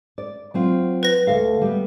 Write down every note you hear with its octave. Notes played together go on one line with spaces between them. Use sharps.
D5
F#3 C4 F4
B4 A#6
D2 A4 F5
G3 B3